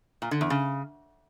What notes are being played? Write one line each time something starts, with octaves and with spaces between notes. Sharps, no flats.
A#2
D3
E2
C#3